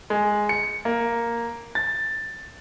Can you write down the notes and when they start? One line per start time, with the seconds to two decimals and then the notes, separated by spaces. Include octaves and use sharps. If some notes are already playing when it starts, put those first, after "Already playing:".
0.10 G#3
0.49 C#7
0.85 A#3
1.75 A6